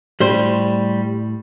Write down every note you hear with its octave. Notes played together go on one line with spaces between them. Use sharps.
A2 G3 C5